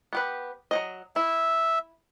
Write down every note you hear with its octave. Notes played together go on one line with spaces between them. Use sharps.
B3 G4 B4
F#3 C4 D#5
E4 E5